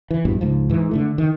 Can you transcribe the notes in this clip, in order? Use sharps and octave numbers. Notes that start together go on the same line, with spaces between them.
E3
A#1 G2 B2
C#2 G#2 F3
G#2 E3
D3 E3 A3
D#3